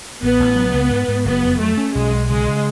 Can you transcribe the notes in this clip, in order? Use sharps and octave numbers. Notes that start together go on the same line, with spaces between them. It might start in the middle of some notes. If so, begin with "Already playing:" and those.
A1 B3
A1
F#3
C#2
G#2
G#2
F#1 B3
F2
F#3 A3
C#4
B1 G#3
B1
C#3 G#3
C#3